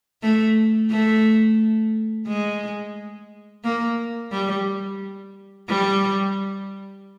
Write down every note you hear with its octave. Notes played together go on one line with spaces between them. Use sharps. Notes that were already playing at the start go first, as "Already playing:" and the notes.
A3
A3
G#3
A#3
G3
G3